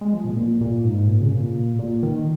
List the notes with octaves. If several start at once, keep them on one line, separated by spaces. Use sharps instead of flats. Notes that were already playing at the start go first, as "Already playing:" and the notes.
G#3
F3
A#2
A#2
A#2
G#2
A#2
C#3
A#2
A#2
D#3